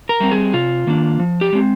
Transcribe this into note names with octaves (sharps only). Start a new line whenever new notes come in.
A#4
G3 C4
G#4
C3 F4
D#3 A#3 D4
F3
G4
G#3 C4